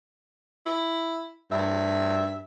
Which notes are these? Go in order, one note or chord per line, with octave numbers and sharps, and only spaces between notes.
E4
G2 E5